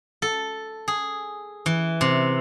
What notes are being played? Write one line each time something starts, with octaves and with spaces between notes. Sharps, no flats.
A4
G#4
E3
C3